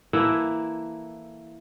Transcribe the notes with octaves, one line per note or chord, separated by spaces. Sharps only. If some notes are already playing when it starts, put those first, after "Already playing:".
E3 A#3 E4 A4